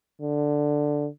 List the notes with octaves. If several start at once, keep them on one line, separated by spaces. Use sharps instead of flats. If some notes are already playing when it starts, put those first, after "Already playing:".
D3